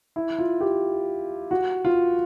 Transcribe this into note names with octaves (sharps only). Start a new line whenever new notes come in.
E4
F4
G4
F#4
F4